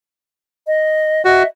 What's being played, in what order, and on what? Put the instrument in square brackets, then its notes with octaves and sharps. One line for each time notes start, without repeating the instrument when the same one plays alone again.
[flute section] D#5
[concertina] F#4 [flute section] D#5 E5